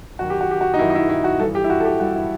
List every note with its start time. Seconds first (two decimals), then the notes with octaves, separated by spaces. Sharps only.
0.19 F#2 D#3 F#4
0.30 G4
0.41 F#4
0.51 G4
0.61 F#4
0.74 D#4
0.79 F#2 D#3 E4
0.90 D#4
0.95 E4
1.10 E4
1.24 F#4
1.39 G2 E3 A4
1.55 G4
1.64 E4
1.70 F#4
1.80 A4
1.85 G4
2.00 G2 E3 F#4
2.15 E4